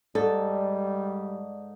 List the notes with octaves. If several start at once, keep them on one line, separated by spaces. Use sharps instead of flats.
G#2 G3 A4 D5